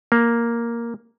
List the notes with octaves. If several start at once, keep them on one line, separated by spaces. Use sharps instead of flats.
A#3